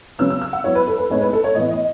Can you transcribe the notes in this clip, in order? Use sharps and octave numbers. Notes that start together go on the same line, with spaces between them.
C#3 F#3 B3 E6
E6
E6
F#5
F#3 B3 E4 C#5
B4
A4
B4
A2 G#3 B3 D#4 C#5
B4
A4
C#5
A2 E3 B3 D#5
D#5